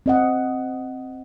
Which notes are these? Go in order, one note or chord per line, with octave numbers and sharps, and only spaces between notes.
C4 D#5 F#5